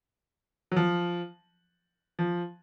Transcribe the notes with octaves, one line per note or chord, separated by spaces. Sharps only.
F#3
F3
F3